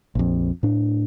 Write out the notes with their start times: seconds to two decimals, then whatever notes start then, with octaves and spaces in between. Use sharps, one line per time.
0.15 A#1 F2
0.63 A2 D4